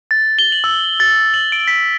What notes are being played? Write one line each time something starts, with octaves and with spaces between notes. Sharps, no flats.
A6
G7
F#7
E6
A6
F#7
D7
B6